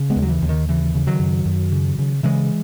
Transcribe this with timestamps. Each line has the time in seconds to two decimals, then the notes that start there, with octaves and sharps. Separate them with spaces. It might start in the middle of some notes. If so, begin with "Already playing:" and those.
Already playing: C#3
0.10 G#3 B3
0.16 D#2
0.22 F#3
0.29 E3
0.42 D#2
0.49 D#3
0.68 C#3 E3
0.94 C#3
1.07 D#3 F#3
1.20 F#2
1.45 F#2
1.72 C#3
1.99 C#3
2.23 C#3 E3 G#3